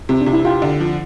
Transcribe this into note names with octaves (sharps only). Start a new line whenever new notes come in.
C3 C4
D4
C3
E4
F4 G4
D3
F3